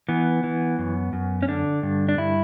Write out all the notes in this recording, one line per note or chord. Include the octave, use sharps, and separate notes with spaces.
E3 B3
E3
F#2
F#2
C#4
D3 D4
G2
D4
G2 E4